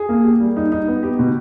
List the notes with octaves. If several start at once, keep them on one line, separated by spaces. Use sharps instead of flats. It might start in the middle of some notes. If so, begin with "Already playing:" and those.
Already playing: G#4
A#3
G4
G3
D#4
D#4
B3
G4
B2